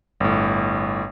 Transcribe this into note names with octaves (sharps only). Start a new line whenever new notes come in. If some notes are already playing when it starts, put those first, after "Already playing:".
G1 A2